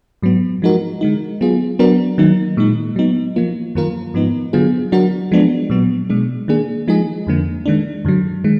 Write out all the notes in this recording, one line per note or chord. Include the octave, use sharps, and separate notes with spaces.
G#2 F#3 B3
F3 G#3 D#4 F#4 A#4
D3 G#3 D#4
F#3 B3 F4 G#4
F#3 B3 D4 F#4 A#4
D#3 F#3 A#3 D#4
A#2 G#3 D#4
F#3 B3 D#4
F3 A#3 F4
F#2 D#3 A#3 F4 A#4
G#2 F3 B3 D#4
D3 F#3 B3 F4 G#4
F#3 D4 F#4 A#4
F3 G#3 B3 D4
A#2 F#3 B3
B2 G#3 D4
D#3 A#3 D4 G#4
F3 G#3 D#4 G#4
F2 D3 F3 A#3
D#3 G#3 D4
F#2 D3 F#3
D#3 G#3